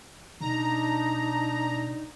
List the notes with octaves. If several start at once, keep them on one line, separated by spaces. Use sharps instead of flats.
B2 D4 D#4 A#5